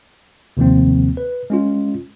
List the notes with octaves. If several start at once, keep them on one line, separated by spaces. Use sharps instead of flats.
D#2 C3 D#3 F3 A#3 C4
B4
G#3 C#4 F4